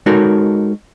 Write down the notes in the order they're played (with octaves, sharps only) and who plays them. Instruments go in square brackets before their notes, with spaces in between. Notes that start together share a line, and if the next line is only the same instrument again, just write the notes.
[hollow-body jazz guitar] G#3 D#4 F#4 A4 A#4 C#5